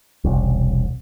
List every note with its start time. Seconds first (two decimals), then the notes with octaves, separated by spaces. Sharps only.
0.25 E1 C2